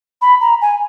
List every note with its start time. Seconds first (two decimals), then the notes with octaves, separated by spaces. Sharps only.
0.22 B5
0.41 A#5
0.62 G#5